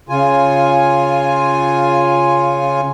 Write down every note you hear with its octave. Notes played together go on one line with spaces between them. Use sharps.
C#3 F4 G#5